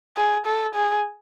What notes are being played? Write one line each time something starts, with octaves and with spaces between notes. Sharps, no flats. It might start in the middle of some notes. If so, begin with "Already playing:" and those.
G#4
A4
G#4